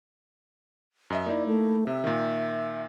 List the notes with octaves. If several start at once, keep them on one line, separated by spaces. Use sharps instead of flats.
F#2 D#5 E5
A#3 D#4 E4 D5
A3
C3 E5
A#2 D#3